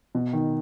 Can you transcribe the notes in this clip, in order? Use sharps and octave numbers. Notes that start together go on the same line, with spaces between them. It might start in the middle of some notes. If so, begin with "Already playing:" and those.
B2
D#3